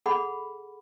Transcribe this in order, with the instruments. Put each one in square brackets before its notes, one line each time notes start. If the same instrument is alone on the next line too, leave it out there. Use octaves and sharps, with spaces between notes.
[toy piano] G#4 A4 F#5 B5